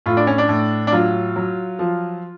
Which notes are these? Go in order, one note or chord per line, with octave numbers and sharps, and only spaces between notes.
A2 F4
D4
C#4
D4
A2
D4
F#3 F4
F#3
F3